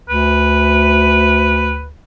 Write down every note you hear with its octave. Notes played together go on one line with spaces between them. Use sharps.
D2 B4